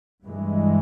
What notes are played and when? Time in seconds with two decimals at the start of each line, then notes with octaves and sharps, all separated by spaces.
0.24 G2 E3 G#3